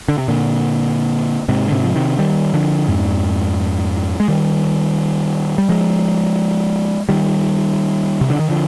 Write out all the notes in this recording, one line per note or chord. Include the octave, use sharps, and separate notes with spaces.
D3
C3
A#2 D3
G#2 C3
D3
G#2 C3
F3
C3 D#3
D#3 G3
D3 F3
F2 G#2
G#3
D#3 G3
G3
F3 G#3
D#3 G3
C3
D3
D#3
D3 F3